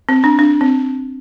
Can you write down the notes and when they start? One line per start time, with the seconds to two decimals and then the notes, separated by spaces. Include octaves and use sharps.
0.09 C4
0.24 D4
0.39 D4
0.61 C4